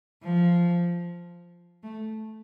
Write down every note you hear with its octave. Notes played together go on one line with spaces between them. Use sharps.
F3
A3